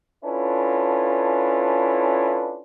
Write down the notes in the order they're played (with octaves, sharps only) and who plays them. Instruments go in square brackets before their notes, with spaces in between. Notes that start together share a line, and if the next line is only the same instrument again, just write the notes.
[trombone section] C#4 D4 E4 F4 A4 B4